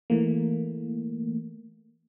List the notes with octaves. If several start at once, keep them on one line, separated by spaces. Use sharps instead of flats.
E3 A3 A#3